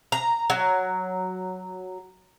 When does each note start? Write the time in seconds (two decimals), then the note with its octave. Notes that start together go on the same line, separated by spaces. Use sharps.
0.12 A#5
0.50 F#3